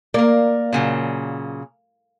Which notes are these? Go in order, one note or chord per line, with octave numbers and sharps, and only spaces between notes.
A#3 A#4 D5
A#2 C#3 F#3